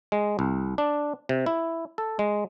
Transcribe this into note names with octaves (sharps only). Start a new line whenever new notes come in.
G#3
C2
D4
C3
E4
A4
G#3